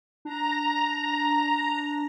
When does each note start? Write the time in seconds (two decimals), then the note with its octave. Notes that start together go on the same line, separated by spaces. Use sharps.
0.25 D4 A#5